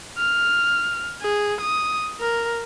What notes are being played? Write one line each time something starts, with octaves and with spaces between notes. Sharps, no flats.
F6
G#4
D#6
A#4